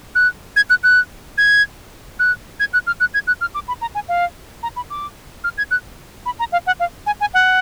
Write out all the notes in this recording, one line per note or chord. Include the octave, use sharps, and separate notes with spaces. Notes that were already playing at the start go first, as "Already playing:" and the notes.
F#6
G#6
F#6
F#6
G#6
F#6
G#6
F#6
F6
F#6
G#6
F#6
F6
D6
B5
A#5
G#5
F5
A#5
B5
D6
F6
G#6
F#6
B5
A#5
F5
F#5
F5
G#5
G#5
F#5